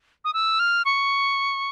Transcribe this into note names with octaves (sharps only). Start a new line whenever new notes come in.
D#6
E6
F6
C#6